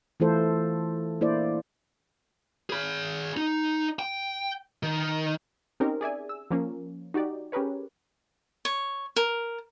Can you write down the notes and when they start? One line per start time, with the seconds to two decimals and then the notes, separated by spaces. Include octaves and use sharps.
0.20 E3 A3 E4 F4 A4 C5
1.21 A#3 E4 C5 D5
2.70 G#4 B5
3.37 D#4
3.99 G5
4.83 D#3
5.80 C4 C#4 D#4 G4 A#4
6.01 G#4 D5 E5 G#5
6.29 E6
6.51 F3 A#3 C#4
7.14 D#4 F#4 G4 D5
7.52 C#4 G4 G#4 A#4 B4 C#5
8.65 C#5
9.16 A#4